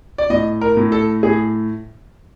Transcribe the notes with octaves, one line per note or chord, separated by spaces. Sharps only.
D5
A2 D#5
A#4
A2
A4
A2 G#4